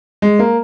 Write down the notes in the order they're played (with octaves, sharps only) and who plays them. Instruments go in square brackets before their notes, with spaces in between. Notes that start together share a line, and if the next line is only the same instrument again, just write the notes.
[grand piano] G#3
A#3